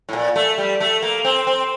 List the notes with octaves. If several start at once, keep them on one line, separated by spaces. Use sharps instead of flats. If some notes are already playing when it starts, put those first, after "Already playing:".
A2
A#2
A3
G3
A3
A#3
C4
C4